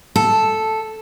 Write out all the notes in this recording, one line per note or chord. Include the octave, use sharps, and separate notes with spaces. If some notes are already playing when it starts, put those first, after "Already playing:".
A4